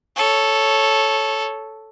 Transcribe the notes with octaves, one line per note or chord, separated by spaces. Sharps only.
A4 C#5